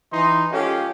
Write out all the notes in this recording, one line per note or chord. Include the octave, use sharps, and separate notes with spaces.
E3 D#4 C6
F3 G#3 C#4 G4 A4 F5